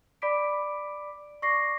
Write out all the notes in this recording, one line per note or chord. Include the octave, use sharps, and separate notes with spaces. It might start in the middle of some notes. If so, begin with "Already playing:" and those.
D5 B5 D6 B6 D7
D5 C#6 D6 A#6 C7